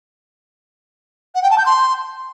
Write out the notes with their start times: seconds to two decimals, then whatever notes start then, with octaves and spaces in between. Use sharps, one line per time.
1.34 F#5
1.42 G5
1.50 A5
1.58 G6
1.65 C6